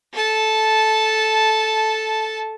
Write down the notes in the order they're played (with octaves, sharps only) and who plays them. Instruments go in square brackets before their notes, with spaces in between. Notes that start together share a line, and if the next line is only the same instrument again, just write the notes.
[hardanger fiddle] A4 A5